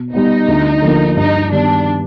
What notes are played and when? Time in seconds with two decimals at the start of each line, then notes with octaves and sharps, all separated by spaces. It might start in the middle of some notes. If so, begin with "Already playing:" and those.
Already playing: B2
0.14 G3 B3 D#4
0.48 D2
0.82 D3 F3 A#3
1.17 G2 D#4
1.51 D#3 G3 B3 D4